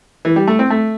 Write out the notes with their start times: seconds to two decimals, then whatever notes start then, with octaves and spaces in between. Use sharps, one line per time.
0.25 E3
0.36 G3
0.47 A3
0.59 C4
0.70 A3